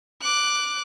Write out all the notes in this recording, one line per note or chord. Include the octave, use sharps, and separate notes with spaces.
D6 F#6